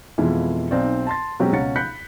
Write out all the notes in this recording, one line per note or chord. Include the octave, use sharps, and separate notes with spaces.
F2 B2 E3 G#3 E4 F4
B1 C4 D#4 D5
A5 C6 A6
B2 F#3 G#3 C4 C#4 G4
C#2 B2 C#4 F#5 A6 C#7
B5 F#6 G6 B6 C#7